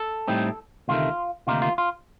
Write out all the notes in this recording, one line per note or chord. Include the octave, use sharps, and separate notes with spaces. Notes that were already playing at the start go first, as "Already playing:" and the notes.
Already playing: A4
A2 G3 C4 D#4
D2 C3 D#3 A3 F4
D2 C3 D#3 A#3 D#4 F4
F4
F4